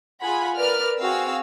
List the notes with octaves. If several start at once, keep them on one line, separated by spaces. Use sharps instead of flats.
F4 G#4 F#5 G#5 B5
A#4 B4 D5 F6
C4 F#4 G#4 F5 E6